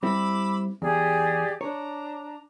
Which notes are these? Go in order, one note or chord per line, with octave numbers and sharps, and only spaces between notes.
G3 C4 E4 B5 D6 E6
E2 G4 G#4 D5
D4 C#5 A#5